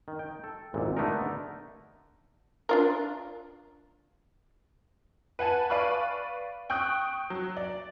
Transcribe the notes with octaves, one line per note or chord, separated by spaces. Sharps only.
D#3
G5
A4
G#1 E2 A#2
D3 A3 B3 D#4 A#4
D4 F4 A#4
B4 F#5 G#5 A5
B4 D5 F5 B5 C#6
G5 C#6 D#6 F#6
F#3
D5